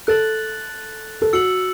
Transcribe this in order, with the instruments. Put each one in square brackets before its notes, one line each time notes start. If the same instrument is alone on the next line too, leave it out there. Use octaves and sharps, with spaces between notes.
[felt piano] A4 [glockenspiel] F#6 A6 F#7
[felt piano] A4
[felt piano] F#4 [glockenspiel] E6 C#7 F#7